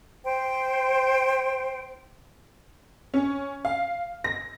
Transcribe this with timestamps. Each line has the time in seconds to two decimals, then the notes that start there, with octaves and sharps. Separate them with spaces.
0.24 C5 G5
3.14 C#4
3.65 F5
4.24 A#6